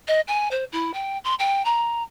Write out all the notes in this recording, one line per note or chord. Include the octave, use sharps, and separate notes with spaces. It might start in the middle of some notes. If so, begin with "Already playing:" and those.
D#5
G#5
C5
E4
G5
C6
G5
A#5